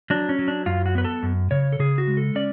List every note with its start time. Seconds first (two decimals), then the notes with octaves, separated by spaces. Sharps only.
0.10 F#3 D4
0.29 C#4
0.39 F#3
0.48 D4
0.66 F#2 F4
0.86 F#4
0.95 B3 B4
1.05 A4
1.23 F#2
1.51 C#3 C#5
1.72 A4
1.79 C#3 G#4
1.98 F#4
2.07 G#3
2.17 A4
2.35 C#4 D5